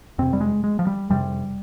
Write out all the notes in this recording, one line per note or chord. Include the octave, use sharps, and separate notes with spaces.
F2 C3 C4
G3
G#3
G#3
F3
G3
F2 C3 G3